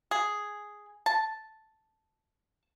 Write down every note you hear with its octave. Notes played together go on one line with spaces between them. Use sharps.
G#4
A5